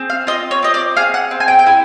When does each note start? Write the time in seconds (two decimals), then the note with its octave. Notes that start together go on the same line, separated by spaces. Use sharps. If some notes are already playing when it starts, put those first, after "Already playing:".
Already playing: C4 G#4
0.10 F5
0.27 F4 D#5
0.51 C#5
0.63 C4 D#5
0.74 D5
0.96 G#4 F5
1.14 F#5
1.31 C4
1.40 G#5
1.48 G5
1.59 G5
1.66 E4 G#5